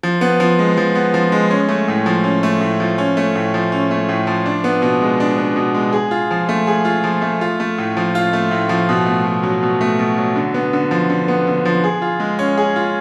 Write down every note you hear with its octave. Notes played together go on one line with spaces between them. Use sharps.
F3
B3
F3
G#3
F3
B3
F3
G#3
C#4
A3
A2
F3
C#4
A3
A2
F3
C#4
A3
A2
F3
C#4
A3
A2
F3
D4
B3
B2
G#3
D4
B3
B2
G#3
G#4
F4
F3
A3
G#4
F4
F3
A3
F4
A3
A2
F3
F4
A3
A2
F3
B2
A3
B2
F#3
B2
A3
B2
F#3
D3
B3
D3
F3
D3
B3
D3
F3
G#4
F4
G#3
C#4
G#4
F4